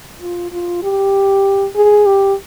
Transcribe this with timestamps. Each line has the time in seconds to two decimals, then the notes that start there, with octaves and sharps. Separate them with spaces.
0.21 F4
0.52 F4
0.83 G4
1.75 G#4
2.06 G4